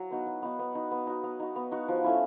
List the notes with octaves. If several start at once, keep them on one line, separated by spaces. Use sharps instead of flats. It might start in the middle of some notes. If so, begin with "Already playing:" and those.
Already playing: F#3
B3 D#4 F#4
F#3
B3 D#4 F#4
B3
D#4 F#4
B3
D#4 F#4
B3
D#4 F#4
B3
D#4 F#4
F3
A3 C#4 E4